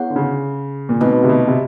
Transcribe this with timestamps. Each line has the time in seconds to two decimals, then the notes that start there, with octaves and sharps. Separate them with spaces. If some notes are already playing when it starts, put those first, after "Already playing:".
Already playing: B3 E4 G#4 C#5 F#5
0.10 D3
0.16 C#3
0.89 A#2
1.01 B2 A3 C4 D#4 F#4 B4
1.24 C3
1.29 B2
1.47 C3